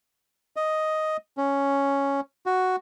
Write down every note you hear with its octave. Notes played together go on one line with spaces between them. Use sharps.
D#5
C#4
F#4